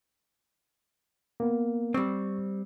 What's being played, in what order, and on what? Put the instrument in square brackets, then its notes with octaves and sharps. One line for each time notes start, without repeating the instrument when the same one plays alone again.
[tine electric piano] A#3 B3
[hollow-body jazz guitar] G3 C4 [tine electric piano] C#6